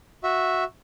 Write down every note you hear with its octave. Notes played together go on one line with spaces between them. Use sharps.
F#4 E5